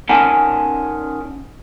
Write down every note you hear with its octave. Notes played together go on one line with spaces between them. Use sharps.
C#4 D#4 A#4 F#5 G#5 A5